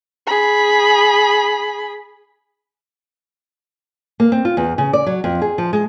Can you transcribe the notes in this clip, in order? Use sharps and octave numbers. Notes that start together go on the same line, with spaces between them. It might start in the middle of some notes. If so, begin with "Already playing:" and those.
G#4 B5
A#3
C4
F4
E2
C#3
D5
F#3
F2
G#4
F3
G#3